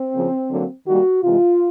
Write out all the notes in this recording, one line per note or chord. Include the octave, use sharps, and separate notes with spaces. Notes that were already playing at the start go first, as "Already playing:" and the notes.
Already playing: C4
C#3 F3 A#3
D3 F#3 A#3
D#3 G3 A#3 F#4
C3 E3 G#3 F4